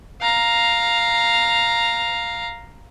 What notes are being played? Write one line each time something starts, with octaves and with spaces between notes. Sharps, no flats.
F5 A#5